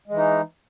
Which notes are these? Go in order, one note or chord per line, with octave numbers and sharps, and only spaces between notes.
E3 G#3 D#4